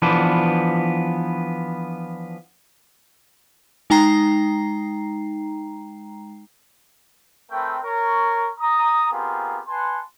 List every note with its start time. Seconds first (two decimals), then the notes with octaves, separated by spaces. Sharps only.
0.02 E3 F3 B3 D4
3.90 G#3 D#4 G5 A#5 C7
7.51 A3 C4 A#4 B4 G5
7.83 A#4 C#5 C#6
8.59 A#5 D#6
9.11 B3 C4 F4 G4 G#4 A#4
9.68 B4 F#5 G#5 A5 C6